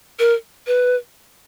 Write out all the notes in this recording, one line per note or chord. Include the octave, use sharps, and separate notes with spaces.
A#4
B4